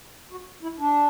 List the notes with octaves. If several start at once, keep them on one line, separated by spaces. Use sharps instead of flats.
F#4
E4
D4